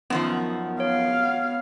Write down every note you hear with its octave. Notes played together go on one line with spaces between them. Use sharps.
F#2 D#3 F3 B3
C#5 F5